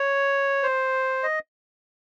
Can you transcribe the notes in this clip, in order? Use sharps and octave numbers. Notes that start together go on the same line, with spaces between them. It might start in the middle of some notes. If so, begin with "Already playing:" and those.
Already playing: C#5
C5
D#5